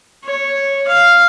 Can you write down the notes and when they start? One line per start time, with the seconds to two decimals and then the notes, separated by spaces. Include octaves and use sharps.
0.25 C#5
0.88 F5